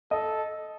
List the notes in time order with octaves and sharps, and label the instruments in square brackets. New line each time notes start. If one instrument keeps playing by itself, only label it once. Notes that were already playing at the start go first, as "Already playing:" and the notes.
[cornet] A4 [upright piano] D#5